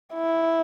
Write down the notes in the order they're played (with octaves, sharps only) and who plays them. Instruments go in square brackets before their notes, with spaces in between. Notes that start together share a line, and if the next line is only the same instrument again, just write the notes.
[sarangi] E4